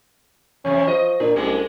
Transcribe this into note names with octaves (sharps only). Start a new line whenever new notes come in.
E2 C3 C#4
F3 D#5
A#2 D4
C2 G#3 A3 C#4